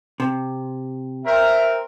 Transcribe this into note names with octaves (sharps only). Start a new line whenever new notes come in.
C3
C4 A#4 E5